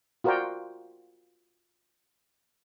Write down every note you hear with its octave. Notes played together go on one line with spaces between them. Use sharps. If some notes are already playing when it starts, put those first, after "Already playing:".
F4 F#4 A#4 C5 D5 G5